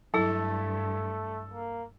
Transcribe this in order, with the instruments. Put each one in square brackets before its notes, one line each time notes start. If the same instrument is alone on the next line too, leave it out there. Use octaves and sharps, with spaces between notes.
[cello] G2 [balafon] F#3 E4 [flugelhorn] A3 [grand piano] A4
[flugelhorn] A#3